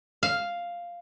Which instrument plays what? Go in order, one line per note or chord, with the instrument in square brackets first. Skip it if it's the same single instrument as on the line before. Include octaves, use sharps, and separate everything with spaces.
[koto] F5